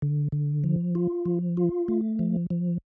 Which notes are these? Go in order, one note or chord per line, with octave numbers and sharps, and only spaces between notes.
D3
D3
F3
F4
F3
F4
A3
F3
F3